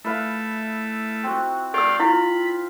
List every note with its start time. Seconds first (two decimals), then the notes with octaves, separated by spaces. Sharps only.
0.04 A3 E4 B4 F5
1.23 C4 F#4
1.74 G4 D5 F5 G5 E6
2.00 E4 F4 B5